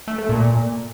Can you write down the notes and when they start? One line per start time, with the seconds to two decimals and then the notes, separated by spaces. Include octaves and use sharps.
0.08 A3
0.18 A3
0.29 A#2